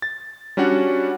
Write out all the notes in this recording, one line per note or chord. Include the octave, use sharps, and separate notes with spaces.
A6
G3 C#4 D4 F#4 F#5